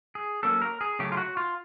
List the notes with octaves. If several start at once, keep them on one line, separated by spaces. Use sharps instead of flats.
G#4
F#3 A#3 C#4 A4
A#4
G#4
C#3 F#3 A3 C#4 G4
F4
F#4
F4